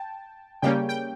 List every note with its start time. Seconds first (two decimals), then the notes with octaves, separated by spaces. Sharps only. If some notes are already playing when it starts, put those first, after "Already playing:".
Already playing: G5 A5
0.62 C#3 G3 A#3 C#4 G5
0.89 G5